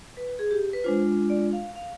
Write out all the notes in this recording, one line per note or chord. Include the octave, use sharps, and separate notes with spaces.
B4
G#4
G4
B4
G#3 D4 F4 C5
D5
F5
F5